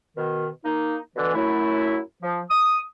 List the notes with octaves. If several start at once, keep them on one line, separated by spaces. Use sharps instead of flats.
B2 D#3
A#3 D#4
B2 D3 E3
F#2 F#3 A3 E4
F3
D#6